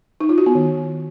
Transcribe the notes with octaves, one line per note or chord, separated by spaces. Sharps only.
D#4
F4
F#4
B3
D#3